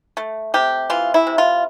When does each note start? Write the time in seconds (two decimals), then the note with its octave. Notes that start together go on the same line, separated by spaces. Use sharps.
0.17 A3
0.54 C3 G4
0.90 E3 F4
1.14 E4
1.27 C3
1.38 F4